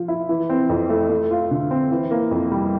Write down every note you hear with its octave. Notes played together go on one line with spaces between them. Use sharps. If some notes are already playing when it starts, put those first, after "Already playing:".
Already playing: F3
E4
E3
C4
F2
A3
A3
F4
D3
C4
E3
A#3
F2
G3